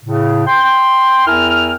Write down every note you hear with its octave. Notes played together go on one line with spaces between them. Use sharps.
A2 C#3
G5 C6
E2 E4 A#4 G5 G#5 F6